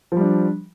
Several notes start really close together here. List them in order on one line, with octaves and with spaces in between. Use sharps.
F3 G3 D4